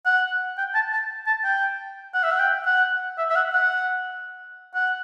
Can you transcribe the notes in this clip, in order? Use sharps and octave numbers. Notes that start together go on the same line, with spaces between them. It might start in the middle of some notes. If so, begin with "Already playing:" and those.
F#5
G5
A5
A5
A5
G5
F#5
E5
F#5
G5
F#5
E5
E5
F#5
F#5
F#5